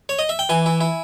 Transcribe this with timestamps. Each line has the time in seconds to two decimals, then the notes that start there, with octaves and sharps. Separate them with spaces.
0.09 C#5
0.19 D#5
0.29 E5
0.39 G5
0.49 E3 G#5
0.66 E4
0.81 E4